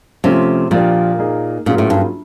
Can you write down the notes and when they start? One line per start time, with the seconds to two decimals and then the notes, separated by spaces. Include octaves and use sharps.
0.24 C3 F3 A3 C#4 F4
0.71 A#2 F3 A#3 D4 G4
1.19 A#3 D#4 G#4
1.66 A#2 F#3 A#3 C#4 F4 G#4
1.78 A2
1.90 G2